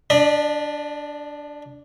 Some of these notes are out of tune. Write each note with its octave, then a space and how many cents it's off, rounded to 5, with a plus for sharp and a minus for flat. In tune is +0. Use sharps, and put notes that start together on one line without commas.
D4 -5 D5 +45 B5 -25